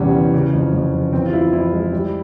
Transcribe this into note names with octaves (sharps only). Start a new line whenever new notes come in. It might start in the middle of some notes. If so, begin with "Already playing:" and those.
Already playing: E2 C3 G3 C#4
E3
C#3
F2
F2
F3
E3 C4
F4
F2 E4
F2 E4
G#3
G3